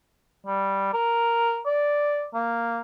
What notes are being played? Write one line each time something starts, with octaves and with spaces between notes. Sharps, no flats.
G3
A#4
D5
A#3